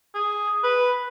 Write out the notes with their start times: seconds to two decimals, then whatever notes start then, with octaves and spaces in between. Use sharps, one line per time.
0.14 G#4
0.63 B4